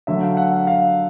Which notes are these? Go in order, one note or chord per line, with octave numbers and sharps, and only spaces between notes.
D3 F#3 A3 E5
F5
F#5
F5
F5